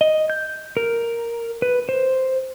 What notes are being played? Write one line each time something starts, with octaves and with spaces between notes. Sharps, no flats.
D#5
G6
A#4
B4
C5